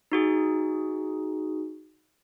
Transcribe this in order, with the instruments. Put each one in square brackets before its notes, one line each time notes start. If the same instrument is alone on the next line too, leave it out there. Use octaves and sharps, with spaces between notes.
[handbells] D#4 F#4 G#4